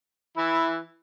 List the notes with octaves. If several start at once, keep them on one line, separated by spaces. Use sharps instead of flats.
E3 E4